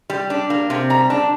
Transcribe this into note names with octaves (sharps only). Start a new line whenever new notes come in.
G3
D4
A#3
C3
G3 A#5
D4 A5